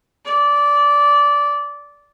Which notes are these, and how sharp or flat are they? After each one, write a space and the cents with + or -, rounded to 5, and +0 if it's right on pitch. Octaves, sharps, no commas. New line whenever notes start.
D5 -15